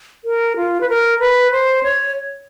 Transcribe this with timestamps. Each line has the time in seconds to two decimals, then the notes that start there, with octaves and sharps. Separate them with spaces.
0.25 A#4
0.57 F4
0.81 B4
0.89 A#4
1.20 B4
1.52 C5
1.83 C#5